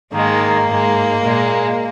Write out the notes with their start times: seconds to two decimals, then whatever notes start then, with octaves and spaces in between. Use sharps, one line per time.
0.13 G#2 D#3 G#3 A#3
0.68 G#2 G#3
1.23 A#2 G#3